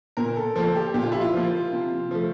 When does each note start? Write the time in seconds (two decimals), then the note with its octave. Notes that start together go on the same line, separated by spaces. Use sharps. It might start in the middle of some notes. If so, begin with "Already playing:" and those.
0.17 A#2 A#4
0.36 A4
0.56 F3 A#3 A4
0.75 G4
0.94 A#2 G4
1.03 F4
1.12 E4
1.21 F4
1.34 F3 A#3
1.72 C3
2.11 F3 A3